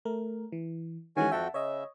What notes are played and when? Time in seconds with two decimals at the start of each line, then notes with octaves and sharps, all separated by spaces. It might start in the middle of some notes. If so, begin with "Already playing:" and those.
0.05 A3 A#4
0.52 E3
1.17 D#3 E3 G#3 C#4 F#4 G#5
1.31 F2 F#4 E5 F#5 G5 A5
1.54 C#3 C#5 D#5 E5